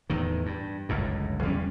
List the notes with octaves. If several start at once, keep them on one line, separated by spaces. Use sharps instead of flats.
E2 A2 D#3
G2
G1 C#2 F#2 A2
E2 G3 C#4